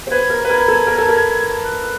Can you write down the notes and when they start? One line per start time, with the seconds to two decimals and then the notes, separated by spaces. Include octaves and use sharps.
0.07 C5
0.11 B4 G#6
0.30 A#4
0.45 B4
0.50 A#4
0.68 A4
0.87 A#4
0.98 A4
1.09 A#4
1.64 F#6